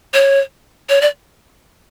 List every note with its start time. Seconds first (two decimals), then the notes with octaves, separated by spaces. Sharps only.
0.14 C#5
0.89 C#5
1.01 D5